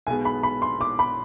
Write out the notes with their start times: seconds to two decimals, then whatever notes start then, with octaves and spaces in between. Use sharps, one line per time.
0.07 B1 B2 G#3 B3 G#5
0.25 B5
0.43 B5
0.62 C6
0.81 D6
0.99 B5